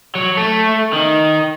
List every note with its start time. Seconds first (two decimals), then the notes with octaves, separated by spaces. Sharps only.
0.15 F#3
0.37 A3
0.93 D#3